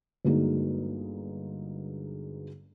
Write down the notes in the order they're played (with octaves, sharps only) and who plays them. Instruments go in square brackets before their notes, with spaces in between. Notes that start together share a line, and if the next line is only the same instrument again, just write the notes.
[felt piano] G1 D3 F#3 G#3 A#3 D#4